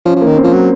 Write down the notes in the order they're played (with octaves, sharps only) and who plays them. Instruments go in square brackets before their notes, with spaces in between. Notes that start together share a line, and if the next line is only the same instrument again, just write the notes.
[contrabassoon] F3 [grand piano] C#4
[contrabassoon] F3
[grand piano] A#3
[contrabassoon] D#3
[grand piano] C4
[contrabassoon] F3
F#3